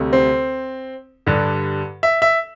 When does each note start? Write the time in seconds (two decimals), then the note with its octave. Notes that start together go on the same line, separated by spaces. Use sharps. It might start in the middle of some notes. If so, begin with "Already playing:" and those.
Already playing: D2 C3 G3
0.13 C4
1.26 G2 D3 G3
2.03 E5
2.22 E5